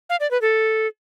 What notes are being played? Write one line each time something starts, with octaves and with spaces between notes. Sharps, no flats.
F5
D5
B4
A4